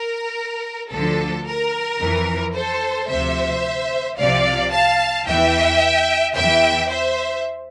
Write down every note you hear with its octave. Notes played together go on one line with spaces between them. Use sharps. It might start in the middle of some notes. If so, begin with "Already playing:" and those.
Already playing: A#4
D2 D3 F3 A4
A#4
F2 E3
A4 C5
D2 C3 F3 C5 E5
C2 C3 F3 D5 F5
F5 A5
E2 E3 E5 G5
E2 E3 E5 G5
C5 E5